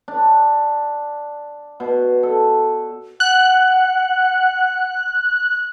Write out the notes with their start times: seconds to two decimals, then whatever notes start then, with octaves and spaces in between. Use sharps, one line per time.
0.08 D4
1.80 B2
2.23 A4
3.20 F#5 F#6